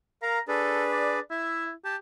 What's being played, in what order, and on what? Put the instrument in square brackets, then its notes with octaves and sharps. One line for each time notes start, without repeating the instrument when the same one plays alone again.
[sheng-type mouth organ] A#4 F5 [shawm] A#5
[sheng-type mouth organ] D4 G#4 B4 [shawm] A4
[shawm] D5
[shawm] E4 [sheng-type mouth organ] E5
[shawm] G4 [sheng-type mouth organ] A5